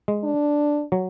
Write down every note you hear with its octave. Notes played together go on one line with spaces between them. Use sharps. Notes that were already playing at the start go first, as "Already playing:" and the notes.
G#3
D4
F#3